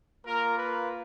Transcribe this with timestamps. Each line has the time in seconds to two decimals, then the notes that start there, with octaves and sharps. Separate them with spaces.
0.24 A#3 F4 A#4
0.56 B4